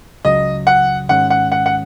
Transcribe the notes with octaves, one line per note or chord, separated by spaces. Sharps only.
C#2 C#3 F#3 D#5
F#5
G#2 D#3 G#3 C#4 F#5
F#5
F#5
F#5